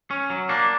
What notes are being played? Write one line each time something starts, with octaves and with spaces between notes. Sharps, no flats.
C#4
F#3
A#3 D4